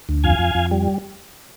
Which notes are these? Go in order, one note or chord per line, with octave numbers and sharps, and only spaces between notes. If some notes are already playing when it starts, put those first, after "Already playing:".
D2
F2 F5 G#5
F2
F2
G3